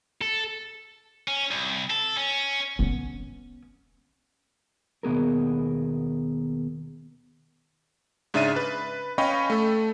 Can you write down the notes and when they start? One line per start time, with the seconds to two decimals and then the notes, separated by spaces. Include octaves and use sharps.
0.22 A4
1.28 C#4
1.51 C2
1.90 A4
2.17 C#4
2.79 B3 C#4
5.03 D#2 B2 B3 G#4 A#4
8.34 G#2 C#3 D4 E5 A6 D#7
8.56 B4
9.18 C#4 D#5 F5 G5 B5 C#6
9.50 A3 A4